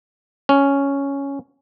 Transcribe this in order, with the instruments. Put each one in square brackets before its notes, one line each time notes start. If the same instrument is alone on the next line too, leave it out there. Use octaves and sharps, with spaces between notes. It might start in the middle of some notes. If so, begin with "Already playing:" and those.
[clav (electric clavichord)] C#4